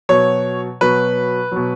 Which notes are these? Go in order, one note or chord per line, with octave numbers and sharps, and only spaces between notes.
B2 F#3 C#5
B2 F#3 B4
B2 F#3